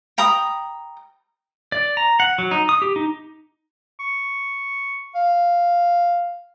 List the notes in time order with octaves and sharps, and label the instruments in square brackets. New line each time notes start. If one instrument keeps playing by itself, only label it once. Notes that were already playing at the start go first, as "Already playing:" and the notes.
[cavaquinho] G5 A#5 B5 D#6
[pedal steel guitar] D5
A#5
F#5
F#3
D#4
D#6
G4
D#4
[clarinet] C#6
F5